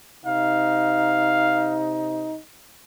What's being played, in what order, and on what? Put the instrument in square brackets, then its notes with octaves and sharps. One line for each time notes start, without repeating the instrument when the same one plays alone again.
[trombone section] C3 D#4 [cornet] F5